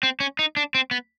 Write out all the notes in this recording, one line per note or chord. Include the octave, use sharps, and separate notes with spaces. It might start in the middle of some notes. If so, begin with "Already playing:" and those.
C4
C#4
D#4
D4
C4
B3